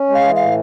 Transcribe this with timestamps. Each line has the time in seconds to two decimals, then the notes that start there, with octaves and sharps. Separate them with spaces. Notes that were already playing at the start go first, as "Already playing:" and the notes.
Already playing: C#4
0.09 G#3
0.14 F5
0.24 E3
0.36 A2 F5